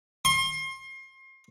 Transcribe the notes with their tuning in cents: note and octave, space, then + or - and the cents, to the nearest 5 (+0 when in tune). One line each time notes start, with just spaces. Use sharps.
C6 +35